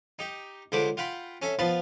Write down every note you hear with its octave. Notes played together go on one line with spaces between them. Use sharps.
D#4 G4
C#2 D3 C5 B5 D6
F4 F#5 G5 B5
C#4 A4 E5
F3 B3 F4 A5 B5